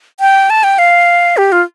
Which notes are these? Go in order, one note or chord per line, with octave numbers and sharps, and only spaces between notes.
G5
A5
G5
F5
G4
F4